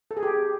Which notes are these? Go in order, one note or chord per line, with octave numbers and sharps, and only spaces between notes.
A4
G#4
G4